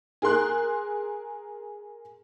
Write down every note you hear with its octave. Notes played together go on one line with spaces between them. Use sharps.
G#4 A#4 C6 F#6